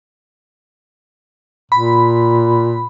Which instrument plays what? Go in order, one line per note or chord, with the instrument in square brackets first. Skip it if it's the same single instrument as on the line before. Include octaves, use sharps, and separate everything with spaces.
[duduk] A#2 [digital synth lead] B5